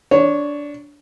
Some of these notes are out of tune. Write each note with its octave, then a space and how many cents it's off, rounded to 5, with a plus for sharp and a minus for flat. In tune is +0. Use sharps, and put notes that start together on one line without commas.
D4 -15 C#5 +0